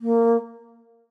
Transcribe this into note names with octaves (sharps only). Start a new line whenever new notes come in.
A#3